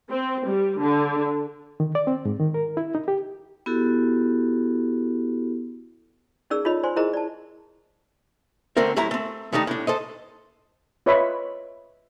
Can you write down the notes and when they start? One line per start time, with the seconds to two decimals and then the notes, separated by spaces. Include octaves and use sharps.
0.10 C4
0.47 G3
0.80 D3
1.80 D#3
1.95 D5
2.07 C4
2.25 G#2
2.39 D#3
2.54 A#4
2.77 E4
2.95 D#4
3.08 G4
3.66 B3 E4 F#4 G4 A4
6.50 C#4 D#4 G#4 A#4 D5 E6
6.65 D#4 F4 A4 C#5 D#5 B5
6.83 C5 D5 G#5 C6
6.96 E4 G#4 A#4 C5 D#5 A#5
7.14 D5 A5
8.77 D3 A3 C4 A#4 C5
8.97 F#2 A2 E4 A#5
9.11 A3 C4
9.53 D#3 G3 A3 D#4
9.67 A2 D4
9.87 A4 C5 D#5
11.06 F4 B4 C#5 D#5 E5 B5